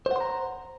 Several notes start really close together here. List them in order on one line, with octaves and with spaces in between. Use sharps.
C5 F#5 C6 A#5